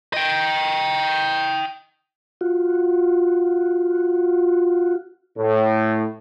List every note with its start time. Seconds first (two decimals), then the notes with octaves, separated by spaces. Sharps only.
0.13 D#5 G5
2.41 F4 F#4
5.38 A2